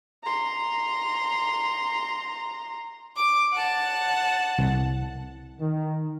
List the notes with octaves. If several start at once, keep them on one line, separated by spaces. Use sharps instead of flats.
A#5 C6
D6
F#5 A5
C2
D#3